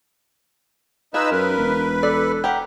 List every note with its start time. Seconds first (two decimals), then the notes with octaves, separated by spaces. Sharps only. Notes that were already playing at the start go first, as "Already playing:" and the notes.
1.14 D#4 F4 G#4 B4 E6
1.31 F#2 A#4 B4
1.57 E1
2.03 A4 D5
2.44 G4 A#4 F#5